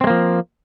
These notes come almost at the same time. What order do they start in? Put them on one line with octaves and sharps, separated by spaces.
C4 G#3 A#3 F3